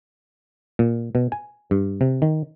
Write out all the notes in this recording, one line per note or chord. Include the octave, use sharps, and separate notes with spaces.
A#2
B2
G#5
G2
C3
D#3